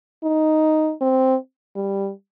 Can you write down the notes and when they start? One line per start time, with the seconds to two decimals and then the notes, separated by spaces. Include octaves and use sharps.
0.24 D#4
1.01 C4
1.76 G3